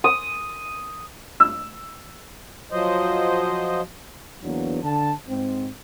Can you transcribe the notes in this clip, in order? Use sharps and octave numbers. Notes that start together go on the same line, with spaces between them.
D#6
E6
F3 F#3 C5 D#5
E2 F#3 A#3 B3 D4
D3 A5
G#2 C4